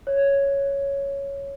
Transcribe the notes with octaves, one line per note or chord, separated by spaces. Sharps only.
C#5